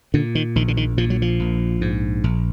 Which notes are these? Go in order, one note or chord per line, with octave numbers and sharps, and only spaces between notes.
A#2 D3
D#3
A#1 D#3
D3
D#3
A#2 F3
F#3
F3
A#1
G#2
A#1